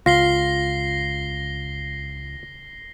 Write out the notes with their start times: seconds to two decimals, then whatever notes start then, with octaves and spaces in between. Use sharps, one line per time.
0.06 C#2 F4 A#6 C7 G7